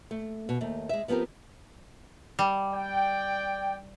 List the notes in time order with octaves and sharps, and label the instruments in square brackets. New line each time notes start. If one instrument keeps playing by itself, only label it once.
[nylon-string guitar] A3
B2
D#2 A3
G#3 E5
F3 B3 C4 G4 A#4
[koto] G3
[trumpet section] D5 G5